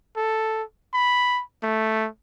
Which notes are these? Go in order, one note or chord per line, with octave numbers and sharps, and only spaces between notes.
A4
B5
A3